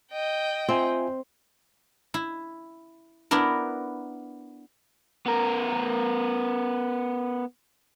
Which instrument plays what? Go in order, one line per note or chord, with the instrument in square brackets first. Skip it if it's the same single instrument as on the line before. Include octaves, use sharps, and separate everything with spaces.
[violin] D#5 G5
[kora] C4 [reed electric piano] F4 E5 G#5
[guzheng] E4
B3 D4 E4 A#4
[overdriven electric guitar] B3 A#4